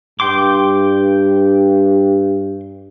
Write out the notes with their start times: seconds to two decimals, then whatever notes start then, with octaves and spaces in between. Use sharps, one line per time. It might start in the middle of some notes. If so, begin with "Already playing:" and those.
0.20 G2 G5 C6 D6